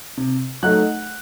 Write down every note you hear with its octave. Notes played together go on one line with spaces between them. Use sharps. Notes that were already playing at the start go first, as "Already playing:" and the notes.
C3
F#3 A3 D#4 F#5 F#6